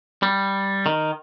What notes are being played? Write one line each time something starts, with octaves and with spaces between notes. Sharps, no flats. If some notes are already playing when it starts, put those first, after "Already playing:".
G3
D#3